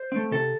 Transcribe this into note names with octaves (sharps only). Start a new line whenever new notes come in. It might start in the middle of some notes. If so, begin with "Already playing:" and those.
Already playing: C5
A3 C4
C3 A4